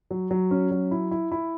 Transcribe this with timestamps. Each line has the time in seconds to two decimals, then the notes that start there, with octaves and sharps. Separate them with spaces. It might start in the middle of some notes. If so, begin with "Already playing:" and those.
0.11 F#3
0.31 F#3
0.51 C#4
0.71 F#3
0.91 E4
1.11 E4
1.32 E4